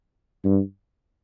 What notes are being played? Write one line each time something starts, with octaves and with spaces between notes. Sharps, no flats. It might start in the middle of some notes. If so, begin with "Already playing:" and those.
G2